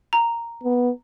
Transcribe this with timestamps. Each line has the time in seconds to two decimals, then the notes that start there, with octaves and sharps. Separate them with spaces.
0.13 A#5
0.63 B3